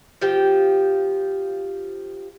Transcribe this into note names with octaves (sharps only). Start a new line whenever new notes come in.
F3 G4 G5